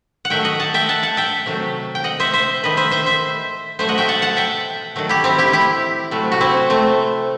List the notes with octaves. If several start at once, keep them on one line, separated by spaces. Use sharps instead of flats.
F#5
D#3 F#3 A3 E5 G5
D#5 F#5
F#5 A5
E5 G5
F#5 A5
F#5 A5
E5 G5
C3 D#3 F#3 A3
G5
D#5 F#5
C5 E5
C5 E5
D#3 A3 B4 D#5
C5 E5
C5 E5
C5 E5
B2 F#3 A3 C5 E5
D#5 F#5
E5 G5
F#5 A5
F#5 A5
E5 G5
D#3 F#3 A3
E4 G4
C4 E4
E4 G4
E4 G4
C3 F#3 A3
F#4
C4 E4
A3 C4